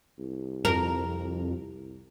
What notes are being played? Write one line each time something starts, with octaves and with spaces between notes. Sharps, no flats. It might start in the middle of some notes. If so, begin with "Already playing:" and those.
C2
F2 A#4